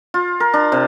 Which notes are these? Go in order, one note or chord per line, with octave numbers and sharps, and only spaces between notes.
F4
A#4
D4
C3